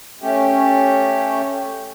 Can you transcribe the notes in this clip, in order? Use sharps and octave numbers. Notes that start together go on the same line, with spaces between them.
A3 C#4 G4